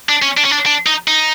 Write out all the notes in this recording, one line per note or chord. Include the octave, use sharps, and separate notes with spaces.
D4
C#4
D4
C#4
D4
D4
D#4
D#4